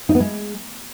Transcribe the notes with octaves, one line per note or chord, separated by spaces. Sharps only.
D#4
B3
G#3